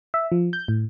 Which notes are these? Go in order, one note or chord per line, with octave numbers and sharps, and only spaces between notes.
E5
F3
G6
A2